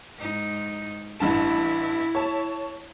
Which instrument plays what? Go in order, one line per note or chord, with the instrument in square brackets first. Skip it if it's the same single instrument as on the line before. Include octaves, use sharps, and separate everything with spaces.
[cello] G#2 D#4
[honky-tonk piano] A1 G2 A5 [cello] E4
[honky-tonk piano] C#5 A5